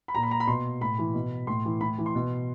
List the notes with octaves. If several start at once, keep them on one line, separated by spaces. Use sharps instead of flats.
B5
A#2 A#5
B5
A#5
B5
B2 C6
A2 B5
E3
B2
A2 C6
E3
A2 B5
E3
C6
B2